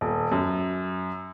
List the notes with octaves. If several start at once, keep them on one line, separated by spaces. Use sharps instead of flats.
D#1
F#2